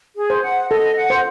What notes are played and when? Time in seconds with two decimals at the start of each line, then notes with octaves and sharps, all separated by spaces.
0.16 G#4
0.30 C5
0.43 F#5
0.70 A4 D#5
0.96 F#5
1.10 C5